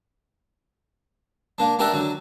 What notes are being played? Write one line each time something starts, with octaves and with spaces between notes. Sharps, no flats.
A#3 D4
D4 G4 A#4 D5 E5 F#5
D3 F#3